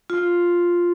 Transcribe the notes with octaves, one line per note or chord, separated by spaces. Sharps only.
F4